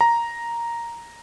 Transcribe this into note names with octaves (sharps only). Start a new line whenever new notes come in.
A#5